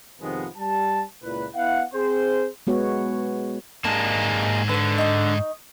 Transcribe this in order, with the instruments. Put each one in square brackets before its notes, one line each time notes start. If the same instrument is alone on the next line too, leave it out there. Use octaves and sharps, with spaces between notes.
[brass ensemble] F2 C3 D#3 F3 G#3 B3
G3 A5
C#2 A#2 A#3 E4 B4
B3 E4 F5 F#5
C4 G#4 C5
[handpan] G#3 B3 F#4 C#5
[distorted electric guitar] G#2 A5 [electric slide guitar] G#3 A#3 [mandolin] D4
[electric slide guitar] D3 [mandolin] B4 C#5
[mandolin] D#4 C#6